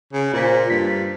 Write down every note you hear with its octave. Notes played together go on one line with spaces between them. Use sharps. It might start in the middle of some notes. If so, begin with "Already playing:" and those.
C#3
A#2 F4 C5 B6
G2 B6